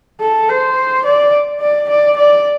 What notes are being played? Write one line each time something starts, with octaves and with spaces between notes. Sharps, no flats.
A4
C5
D5
D5
D5
D5